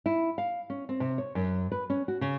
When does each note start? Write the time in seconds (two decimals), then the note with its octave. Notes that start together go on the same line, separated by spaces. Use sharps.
0.06 E4
0.38 F5
0.70 C#4
0.89 C4
1.00 C3
1.18 C#5
1.35 F#2
1.72 B4
1.90 C#4
2.08 F#4
2.21 C#3